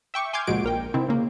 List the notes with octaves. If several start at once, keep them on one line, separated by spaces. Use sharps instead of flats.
E5 G5 C#6 D6
G#5 C6 D6 F6 G6 G#6
C#2 A#2 F3 G#3 F#4 D7
A#1 A#4 G5
C3 D#3 C4 E4
C#3 A#3